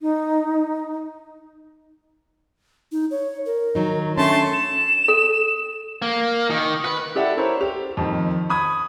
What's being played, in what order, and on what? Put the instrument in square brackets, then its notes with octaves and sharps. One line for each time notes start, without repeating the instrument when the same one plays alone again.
[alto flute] D#4
[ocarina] D#4
C#5
A#4
[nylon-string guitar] D#3 F#3 D#4
[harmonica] A3 A5 C6 [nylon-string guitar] C#4 [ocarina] D4
[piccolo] E7
[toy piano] A4
[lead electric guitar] A#3
D#3
B4
[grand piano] E4 G4 A4 D5 E5 F#5
E4 A#4 C5 C#5 E5
G4 F7
F2 D#3
B5 D#6 G#6